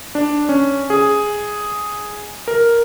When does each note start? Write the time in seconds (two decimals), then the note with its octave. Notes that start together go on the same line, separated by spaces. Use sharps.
0.15 D4
0.49 C#4
0.90 G#4
2.48 A#4